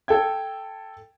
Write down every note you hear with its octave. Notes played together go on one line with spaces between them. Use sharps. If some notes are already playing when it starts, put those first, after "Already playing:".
A4 F5 G5 G#6